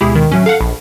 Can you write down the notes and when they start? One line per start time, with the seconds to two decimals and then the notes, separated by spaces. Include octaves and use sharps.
0.01 D2 B2 G#3 E4 G4 G#4
0.15 D#3
0.31 A2 F#3 C#4 E5
0.46 A4 F5 F#5
0.61 A#1 B5